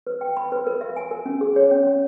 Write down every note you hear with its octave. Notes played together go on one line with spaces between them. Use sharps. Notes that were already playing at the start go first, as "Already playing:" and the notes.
B4
G5
B5
B4
A#4
E5
G#5
A#4
C#4
G#4
C#5
C#4
C#4